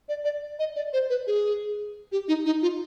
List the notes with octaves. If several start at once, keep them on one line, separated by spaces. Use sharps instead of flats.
D5
D5
D#5
D5
C5
B4
G#4
G4
D#4
D#4
F4